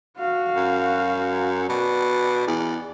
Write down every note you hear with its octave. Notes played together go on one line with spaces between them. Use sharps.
F#4 F5
F#2
B2 D5
E2